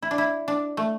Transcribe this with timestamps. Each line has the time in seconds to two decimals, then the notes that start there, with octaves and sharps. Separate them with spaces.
0.02 E4
0.11 D4
0.18 E4
0.48 D4
0.77 A3